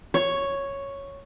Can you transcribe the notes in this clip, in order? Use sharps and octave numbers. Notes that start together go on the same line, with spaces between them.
C#5